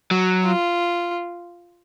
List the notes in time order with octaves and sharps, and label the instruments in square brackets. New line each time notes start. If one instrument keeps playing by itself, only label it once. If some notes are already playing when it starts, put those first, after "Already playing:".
[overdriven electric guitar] F#3
[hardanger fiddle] F4